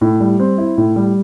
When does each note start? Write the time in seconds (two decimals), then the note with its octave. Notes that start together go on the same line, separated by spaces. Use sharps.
0.01 A2
0.20 G3
0.40 C4
0.58 E4
0.78 A2
0.96 G3